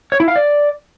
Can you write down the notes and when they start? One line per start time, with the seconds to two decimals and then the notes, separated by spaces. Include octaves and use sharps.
0.12 C#5
0.20 E4
0.28 F5
0.36 D5